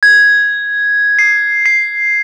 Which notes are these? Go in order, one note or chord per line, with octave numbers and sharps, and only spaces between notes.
G#6
C7
C7